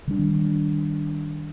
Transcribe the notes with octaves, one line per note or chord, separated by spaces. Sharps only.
D#3 G3 D4